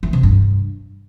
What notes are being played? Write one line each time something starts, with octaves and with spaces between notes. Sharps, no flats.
E3
C3
G2